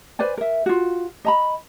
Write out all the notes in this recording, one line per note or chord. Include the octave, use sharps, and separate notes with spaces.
B4 C5 D5 G#5
A#4 E5
F4 F#4
D#5 A#5 B5